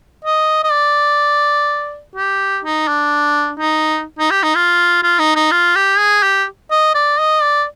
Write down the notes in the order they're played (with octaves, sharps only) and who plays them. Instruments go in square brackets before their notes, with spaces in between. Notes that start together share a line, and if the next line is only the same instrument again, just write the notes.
[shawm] D#5
D#5
D5
G4
D#4
D4
D#4
D#4
G4
D#4
F4
F4
D#4
D#4
F4
G4
G#4
G4
D#5
D5
D#5
D5